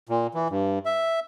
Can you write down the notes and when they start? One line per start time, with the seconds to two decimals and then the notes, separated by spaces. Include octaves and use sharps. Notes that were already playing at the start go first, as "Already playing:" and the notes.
0.09 A#2
0.34 E3
0.50 G2
0.86 E5